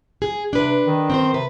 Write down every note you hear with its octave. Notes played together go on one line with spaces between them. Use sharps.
G#4
C3 D4 B4
D#3
C4 C#4 C5
C3 B4